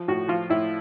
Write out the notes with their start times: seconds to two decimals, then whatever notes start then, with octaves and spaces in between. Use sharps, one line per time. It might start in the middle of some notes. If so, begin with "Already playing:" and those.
Already playing: F3
0.08 A2 F#4
0.28 F3 F4
0.50 A2 E4